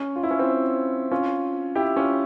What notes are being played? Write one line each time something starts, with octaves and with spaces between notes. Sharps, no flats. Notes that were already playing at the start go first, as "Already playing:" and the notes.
Already playing: C#4
F4
E4
C#4
C4 E4
C#4 F4
E4 G4
C#4 F4